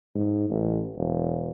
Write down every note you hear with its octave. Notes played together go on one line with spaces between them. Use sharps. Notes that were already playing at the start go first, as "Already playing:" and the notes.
G#2
A1
E1